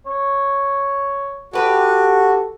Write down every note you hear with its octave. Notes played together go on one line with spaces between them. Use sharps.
C#5
F#4 G4 A4 B4